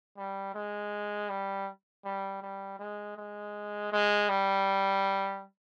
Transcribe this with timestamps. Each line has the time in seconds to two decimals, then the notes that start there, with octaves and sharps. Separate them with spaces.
0.17 G3
0.54 G#3
1.30 G3
2.05 G3
2.42 G3
2.79 G#3
3.16 G#3
3.92 G#3
4.29 G3